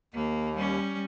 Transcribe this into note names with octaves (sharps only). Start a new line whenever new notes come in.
D#2 A#3
G3 C#4